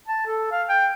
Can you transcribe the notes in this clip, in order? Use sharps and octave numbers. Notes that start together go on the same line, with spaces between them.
A5
A4
F5
G5